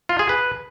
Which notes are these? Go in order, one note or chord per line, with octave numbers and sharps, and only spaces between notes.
F4
G#4
B4